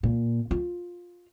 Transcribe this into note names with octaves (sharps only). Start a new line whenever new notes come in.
A#2
F4